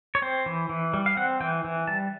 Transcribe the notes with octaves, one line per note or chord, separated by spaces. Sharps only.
C#5
C4 C5
E3
E3
G3
F5
C4 F#5
E3 G5
E3
G3 A5